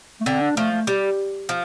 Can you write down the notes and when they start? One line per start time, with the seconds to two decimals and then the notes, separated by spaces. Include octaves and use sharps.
0.20 A3
0.26 D3 C4
0.41 D4
0.57 F3 A3
0.72 A3
0.87 G3
1.49 F3